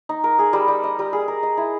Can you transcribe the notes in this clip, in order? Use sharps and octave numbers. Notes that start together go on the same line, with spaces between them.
D#4
A#4
G#4
G3
G3
D#5
G3
G#4
A#4
D#5
E4